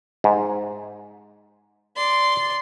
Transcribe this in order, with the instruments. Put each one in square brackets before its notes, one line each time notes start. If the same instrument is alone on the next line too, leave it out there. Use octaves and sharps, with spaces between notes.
[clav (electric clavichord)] G#2
[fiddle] D5 C6